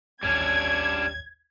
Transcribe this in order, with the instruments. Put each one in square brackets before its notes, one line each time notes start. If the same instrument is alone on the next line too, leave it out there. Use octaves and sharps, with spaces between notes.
[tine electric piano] A1 D#2 C#5 [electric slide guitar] G3 C#4 D4 [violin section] G#6